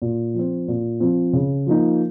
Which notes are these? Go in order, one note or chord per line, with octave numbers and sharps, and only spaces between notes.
A#2
F3 C4
A#2
F3 C4
C#3
F3 A#3 D#4